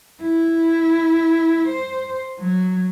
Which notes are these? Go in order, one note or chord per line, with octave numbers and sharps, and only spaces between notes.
E4
C5
F#3